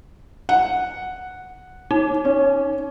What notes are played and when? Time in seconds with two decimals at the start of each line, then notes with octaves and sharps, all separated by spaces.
0.49 F#5
1.91 D#4
2.25 C#4